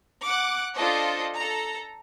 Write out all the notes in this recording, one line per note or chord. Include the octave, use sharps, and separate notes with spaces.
F#5 D6 F#6
D4 F4 A4 C5 D#5
A4 A#5